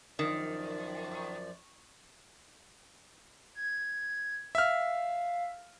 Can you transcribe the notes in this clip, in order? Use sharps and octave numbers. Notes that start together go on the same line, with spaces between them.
F#2 D#3 F3 D5
G#6
E5 F5 F6